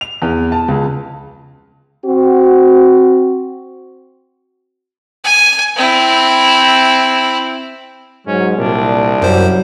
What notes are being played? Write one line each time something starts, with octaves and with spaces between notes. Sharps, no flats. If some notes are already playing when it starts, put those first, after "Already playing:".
F7
E2
A5
C#2
C4 F#4
G#5
C4 E4
G#2 F#3 C#4
C2 A#2 D4
F#2 F#3 C5